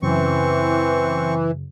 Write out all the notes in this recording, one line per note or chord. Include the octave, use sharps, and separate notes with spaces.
F#2 C#3 E3 C4 C#6